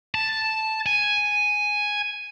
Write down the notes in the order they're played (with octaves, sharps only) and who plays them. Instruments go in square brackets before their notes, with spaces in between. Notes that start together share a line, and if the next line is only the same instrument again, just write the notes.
[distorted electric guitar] A5
G#5